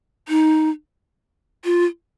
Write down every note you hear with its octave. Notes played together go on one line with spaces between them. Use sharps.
D#4
F4